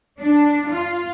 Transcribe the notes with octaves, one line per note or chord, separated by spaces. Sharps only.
D4
F4